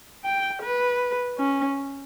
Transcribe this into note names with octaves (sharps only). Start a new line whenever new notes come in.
G5
B4
C#4